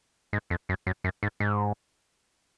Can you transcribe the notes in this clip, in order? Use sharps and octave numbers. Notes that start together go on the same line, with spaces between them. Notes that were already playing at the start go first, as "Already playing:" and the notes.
G#2
F2
F#2
F#2
F#2
G#2
G#2